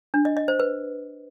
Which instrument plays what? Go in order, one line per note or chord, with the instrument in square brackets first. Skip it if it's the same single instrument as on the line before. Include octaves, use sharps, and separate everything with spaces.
[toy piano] D4
D#5
D#5
C5
B4